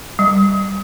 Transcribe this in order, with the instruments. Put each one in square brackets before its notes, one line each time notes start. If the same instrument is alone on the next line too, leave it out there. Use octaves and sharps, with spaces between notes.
[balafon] G3